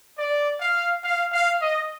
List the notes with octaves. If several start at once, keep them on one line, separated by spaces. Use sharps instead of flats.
D5
F5
F5
F5
D#5